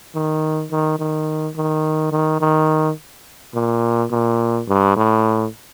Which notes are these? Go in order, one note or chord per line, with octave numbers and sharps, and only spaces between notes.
D#3
D#3
D#3
D#3
D#3
D#3
A#2
A#2
G2
A2